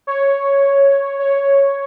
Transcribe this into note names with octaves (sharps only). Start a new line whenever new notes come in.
C#5
C#5